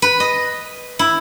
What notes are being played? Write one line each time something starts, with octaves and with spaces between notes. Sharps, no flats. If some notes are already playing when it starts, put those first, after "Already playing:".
B4
D#5
E4